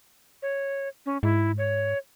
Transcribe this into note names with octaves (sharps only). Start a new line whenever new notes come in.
C#5
C#4
G#2 E4
C#5